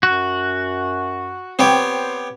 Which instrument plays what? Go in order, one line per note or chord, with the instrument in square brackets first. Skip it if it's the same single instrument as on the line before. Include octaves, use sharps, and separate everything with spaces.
[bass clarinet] F#2 [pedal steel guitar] F#4
[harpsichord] B3 G4 C#5 [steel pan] C4 [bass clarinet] C5